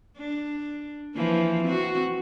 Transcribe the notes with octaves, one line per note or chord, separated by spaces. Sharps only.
D4
E3 F3 A#3
C4 F#4